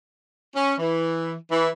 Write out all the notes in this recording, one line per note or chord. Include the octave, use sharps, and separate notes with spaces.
C#4
E3
E3